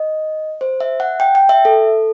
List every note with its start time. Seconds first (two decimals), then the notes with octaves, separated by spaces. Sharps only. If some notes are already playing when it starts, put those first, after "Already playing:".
Already playing: D#5
0.61 C5
0.81 E5
1.00 F#5
1.20 G5
1.35 G5
1.49 E5
1.65 A4